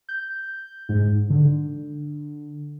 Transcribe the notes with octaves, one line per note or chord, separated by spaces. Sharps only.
G6
G#2
D3